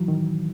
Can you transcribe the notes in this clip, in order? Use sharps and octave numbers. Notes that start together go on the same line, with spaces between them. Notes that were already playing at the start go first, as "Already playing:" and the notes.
Already playing: E3 F#3
D#3